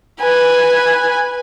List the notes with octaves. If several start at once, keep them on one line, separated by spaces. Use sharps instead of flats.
B4 G#5